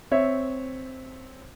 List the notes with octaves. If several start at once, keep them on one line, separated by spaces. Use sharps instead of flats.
C4 C#5 E5